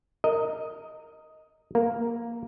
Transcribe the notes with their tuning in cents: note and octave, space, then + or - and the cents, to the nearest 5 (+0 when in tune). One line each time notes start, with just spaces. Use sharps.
A#4 -15 D#5 +5
A#3 +0 A#4 +0